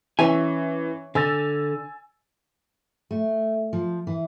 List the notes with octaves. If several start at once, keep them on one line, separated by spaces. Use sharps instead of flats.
E3 C#4 E5 G#5
D3 G#5 E6 A6
A3
F3
E3